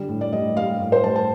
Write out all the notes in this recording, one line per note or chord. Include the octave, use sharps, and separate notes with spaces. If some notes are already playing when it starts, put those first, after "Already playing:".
Already playing: D3 G3
A2
D5
G3 D#5
G3 F5
A2
C5
G3 A5
A5